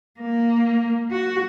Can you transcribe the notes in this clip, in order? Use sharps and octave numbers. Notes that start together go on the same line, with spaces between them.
A#3
F#4